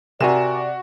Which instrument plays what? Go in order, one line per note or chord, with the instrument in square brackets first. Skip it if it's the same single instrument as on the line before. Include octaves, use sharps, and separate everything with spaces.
[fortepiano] C3 [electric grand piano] F#4 E7 [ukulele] A#4 G#5 A#5 [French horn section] D5